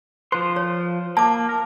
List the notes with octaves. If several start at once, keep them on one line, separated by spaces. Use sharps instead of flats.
F3 C5 C6
C#5
A#3 A5 D6
A#4